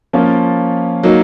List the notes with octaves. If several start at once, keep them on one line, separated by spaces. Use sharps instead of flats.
F3 A#3 C#4 F4
F#3 A#3 D#4